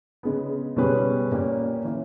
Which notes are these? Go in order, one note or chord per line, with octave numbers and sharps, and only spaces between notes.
C#3 G#3 B3
B2 G3 C#4 G#4 B4
A#2 A#3 C#4 G4
E3 A#3 C#4 E4